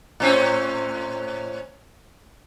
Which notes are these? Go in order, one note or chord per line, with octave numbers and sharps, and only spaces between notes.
A2 C4 C#4